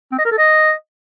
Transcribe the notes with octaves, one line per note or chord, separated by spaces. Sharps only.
C4
D#5
A#4
A4
D#5